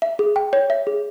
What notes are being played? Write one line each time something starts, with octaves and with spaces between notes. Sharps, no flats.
E5
G#4
G5
C#5
E5
G#4